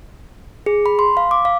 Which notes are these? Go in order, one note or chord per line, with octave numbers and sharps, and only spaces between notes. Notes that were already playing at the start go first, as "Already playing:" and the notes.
G#4
B5
C6
F5
D6
F5